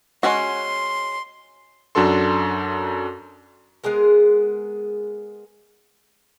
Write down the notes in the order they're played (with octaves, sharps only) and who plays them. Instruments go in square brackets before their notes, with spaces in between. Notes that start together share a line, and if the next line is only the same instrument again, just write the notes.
[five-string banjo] G#3 C#4 F#4 [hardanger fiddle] C6
[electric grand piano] F#2 D4 F#4 A4 C6
[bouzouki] G#3 B3 G#4 A#4